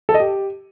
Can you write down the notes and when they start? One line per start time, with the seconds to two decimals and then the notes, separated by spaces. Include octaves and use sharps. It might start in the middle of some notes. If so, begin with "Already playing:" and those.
0.09 A4
0.14 D#5
0.20 G4